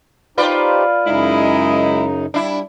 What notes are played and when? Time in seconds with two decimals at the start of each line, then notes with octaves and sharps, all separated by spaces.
0.38 D#4 F4 G4 B4 C5 D5
1.07 F#2 C#3 G#3 D#4 E4 D#5
2.34 G3 D4 E4